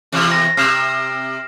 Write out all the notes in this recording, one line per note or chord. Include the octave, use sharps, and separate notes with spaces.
E2 C3
A#6
C3 F6 C7 E7